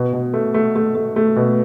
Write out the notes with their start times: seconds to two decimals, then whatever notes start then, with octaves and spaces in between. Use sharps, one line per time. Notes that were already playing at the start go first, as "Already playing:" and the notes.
Already playing: B2
0.13 B2
0.34 A3
0.54 A3
0.76 A3
0.95 A3
1.16 A3
1.36 B2